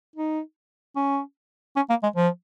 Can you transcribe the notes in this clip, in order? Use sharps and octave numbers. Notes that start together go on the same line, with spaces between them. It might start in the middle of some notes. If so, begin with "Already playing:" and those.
D#4
C#4
C#4
A#3
G#3
F3